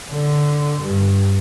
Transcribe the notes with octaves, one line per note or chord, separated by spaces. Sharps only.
D3
G2